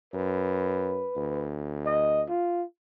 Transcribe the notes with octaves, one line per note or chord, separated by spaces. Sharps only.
F#2 B4
D2
D#5
F4